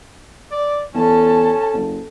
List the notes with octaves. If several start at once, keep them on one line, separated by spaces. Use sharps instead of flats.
D5
E2 C#4 A4 A5
F#1